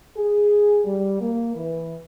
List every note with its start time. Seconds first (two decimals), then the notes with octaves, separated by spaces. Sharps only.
0.16 G#4
0.85 G3
1.20 A#3
1.55 E3